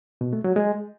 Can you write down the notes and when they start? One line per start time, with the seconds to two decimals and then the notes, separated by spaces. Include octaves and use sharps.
0.21 B2
0.33 A3
0.44 F#3
0.56 G#3